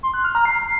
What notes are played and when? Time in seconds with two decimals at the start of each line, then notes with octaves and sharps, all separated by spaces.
0.03 C6
0.14 F#6
0.24 F6
0.35 A#5
0.45 C7